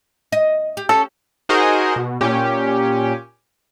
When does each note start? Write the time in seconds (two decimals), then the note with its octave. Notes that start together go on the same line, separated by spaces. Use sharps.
0.32 D#5
0.77 G4
0.89 C#4 A4
1.49 D#4 F#4 G#4 A#4 C5 D#5
1.96 B2
2.21 A#2 C#4 G4